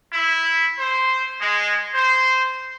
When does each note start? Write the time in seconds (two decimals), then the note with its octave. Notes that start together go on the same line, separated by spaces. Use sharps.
0.13 E4
0.79 C5
1.41 G#3
1.94 C5